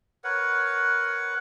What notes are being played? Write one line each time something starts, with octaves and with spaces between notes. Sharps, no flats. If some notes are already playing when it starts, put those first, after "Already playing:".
A#4 B4 C#5 F#5